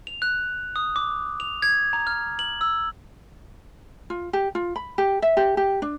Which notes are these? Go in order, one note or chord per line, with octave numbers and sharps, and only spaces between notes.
F7
F#6
D#6
D6
F7
G#6
A#5
F6
F#7
E6
F4
G4
F4
B5
G4
E5
G4
G4
D4